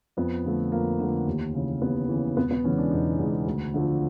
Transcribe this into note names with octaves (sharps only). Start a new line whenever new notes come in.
F2 B3
D3 F3 A3
F2 A#3
D3 F3 A3
D#2
C#3 E3
D#2 B3
C#3 E3
E1 B3
B3
E2 C#3 E3 G#3 C#4
D4
E1 D#4
E2 C#3 E3 G#3
D2
D3 F3 A3